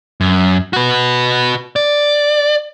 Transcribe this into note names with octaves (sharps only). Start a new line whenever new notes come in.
F#2
F#4 B4
D5